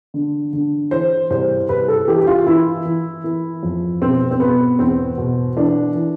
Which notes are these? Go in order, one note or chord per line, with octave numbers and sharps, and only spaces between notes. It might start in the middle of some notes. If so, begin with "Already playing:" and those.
D3
D3
E3 C5
C2 C5
C2 B4
A4
E3 G4
G4
F4
E3 E4
E3
E3
F2
B2 C4
C4
B2 B3
E2 C4
B2
E3 D4
E3